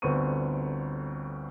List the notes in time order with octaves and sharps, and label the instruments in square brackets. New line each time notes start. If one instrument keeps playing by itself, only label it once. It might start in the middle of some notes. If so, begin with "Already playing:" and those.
[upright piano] G1 D2 B3 C4 C#6 D#7